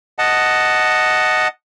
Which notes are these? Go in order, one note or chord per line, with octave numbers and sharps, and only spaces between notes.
D#5 F#5 A5